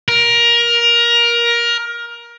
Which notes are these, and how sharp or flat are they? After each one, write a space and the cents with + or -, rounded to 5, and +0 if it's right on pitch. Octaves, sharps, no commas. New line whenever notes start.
A#4 +20